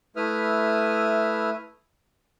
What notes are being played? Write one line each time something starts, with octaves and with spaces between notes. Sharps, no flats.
A3 E4 B4 E5 D#6 F6